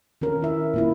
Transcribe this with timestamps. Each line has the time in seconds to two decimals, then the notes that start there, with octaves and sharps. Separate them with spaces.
0.21 D#3 C#4 A#4
0.42 E4 E5
0.74 A#2 A#3 E4